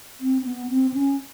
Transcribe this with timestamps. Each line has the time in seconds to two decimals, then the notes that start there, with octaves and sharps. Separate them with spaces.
0.21 C4
0.46 B3
0.70 C4
0.94 C#4